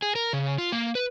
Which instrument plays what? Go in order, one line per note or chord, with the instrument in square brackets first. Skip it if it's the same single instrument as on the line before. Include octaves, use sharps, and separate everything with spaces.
[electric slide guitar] G#4
A#4
C#3
F4
A#3
B4